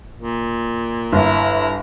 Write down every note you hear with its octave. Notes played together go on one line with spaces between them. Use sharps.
A#2
G1 E4 A#5